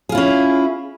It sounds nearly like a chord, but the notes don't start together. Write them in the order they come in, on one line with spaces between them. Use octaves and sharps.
G#4 F4 E4 C#4